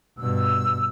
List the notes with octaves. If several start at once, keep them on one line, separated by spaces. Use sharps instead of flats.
G2 B2 E6